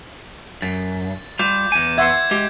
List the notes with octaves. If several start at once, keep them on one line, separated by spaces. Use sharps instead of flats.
F#2 A6
G3 F4 D6 G6
E2 G#5
E5 F#5 C6 G#6
G#3 G4